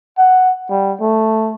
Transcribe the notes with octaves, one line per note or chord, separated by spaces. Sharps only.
F#5
G3
A3